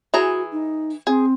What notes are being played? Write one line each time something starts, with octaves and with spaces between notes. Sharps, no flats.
E3 F#4 G#4 A#5
D#4
C4 G#4